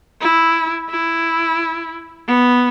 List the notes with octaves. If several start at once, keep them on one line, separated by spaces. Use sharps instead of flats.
E4
E4
B3